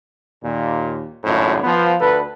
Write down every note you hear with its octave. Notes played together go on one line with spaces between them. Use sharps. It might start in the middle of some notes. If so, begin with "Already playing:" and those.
D#2 A#2
G#1 C#2 F#2 A2
F3 B3
D2 A4 B4